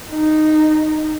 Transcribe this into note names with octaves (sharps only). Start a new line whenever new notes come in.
D#4